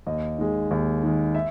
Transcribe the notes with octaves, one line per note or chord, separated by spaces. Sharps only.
D#2 D#5
D#3 G#3
D#2
D#3 G#3
E5